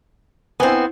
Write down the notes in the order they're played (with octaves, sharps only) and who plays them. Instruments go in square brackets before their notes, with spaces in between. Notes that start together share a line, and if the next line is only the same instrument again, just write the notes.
[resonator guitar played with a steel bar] B3 C4 [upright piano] E4 C5 G#5